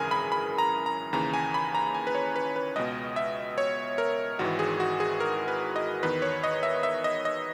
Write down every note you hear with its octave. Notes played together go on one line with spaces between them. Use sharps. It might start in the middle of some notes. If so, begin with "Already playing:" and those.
Already playing: G#1 F#2 C#3 E3 G#4 A#4 G#5
B5
B5
A#5
A#5
D#2 C#3 E3 A#5
G#5
B5
A#5
G#5
B4
C#5
B4
B4
C#2 B2 D#5
E5
C#5
A#4
G#1 G#2 E3 F#4
G#4
F#4
G#4
A#4
B4
D#5
E2 D#3 B4
C#5
D#5
E5
E5
D#5
D#5